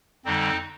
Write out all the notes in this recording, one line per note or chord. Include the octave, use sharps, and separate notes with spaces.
F2 D3 G3 C4 D#4